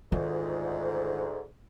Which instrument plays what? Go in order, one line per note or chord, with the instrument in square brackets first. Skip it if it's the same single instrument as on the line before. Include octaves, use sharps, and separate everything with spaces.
[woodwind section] D2 G#2 [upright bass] D#3 F4